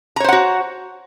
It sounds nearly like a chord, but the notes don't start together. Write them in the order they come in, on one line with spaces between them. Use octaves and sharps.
A#5 C#5 C5 F#5 F#4